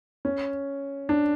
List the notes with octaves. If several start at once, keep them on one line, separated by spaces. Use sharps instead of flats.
C#4
D4